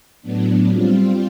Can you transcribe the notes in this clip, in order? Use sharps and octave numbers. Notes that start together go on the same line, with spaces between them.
A2 F#3 B3 D4
G3 C4 F4